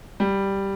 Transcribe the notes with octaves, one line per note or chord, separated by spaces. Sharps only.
G3